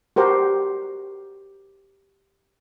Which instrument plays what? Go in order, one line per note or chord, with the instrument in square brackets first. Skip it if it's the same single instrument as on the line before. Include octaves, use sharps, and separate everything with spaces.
[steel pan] F#4 G4 A#4 C5